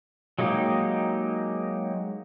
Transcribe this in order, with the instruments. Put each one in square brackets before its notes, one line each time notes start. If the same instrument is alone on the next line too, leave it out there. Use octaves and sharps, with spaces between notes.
[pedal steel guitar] F#3 G#3 A#3 D#4 G4